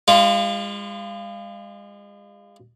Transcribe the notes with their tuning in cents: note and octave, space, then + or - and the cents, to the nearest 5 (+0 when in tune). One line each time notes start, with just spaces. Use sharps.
G#3 -40 F4 -15